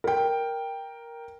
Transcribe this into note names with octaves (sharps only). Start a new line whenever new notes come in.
A#4 G5